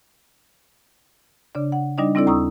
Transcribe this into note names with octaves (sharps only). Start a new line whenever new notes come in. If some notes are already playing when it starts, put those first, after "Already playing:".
C#3 D4 D5
F#5
G3 D4 D#4 D5 D#5
G3 C4 D4 E4 A4 D5
D#2 A#5 C#6 D#6 E6